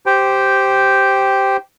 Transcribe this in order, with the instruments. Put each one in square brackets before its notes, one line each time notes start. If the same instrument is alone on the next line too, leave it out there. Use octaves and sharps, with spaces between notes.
[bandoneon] G4 C5 G5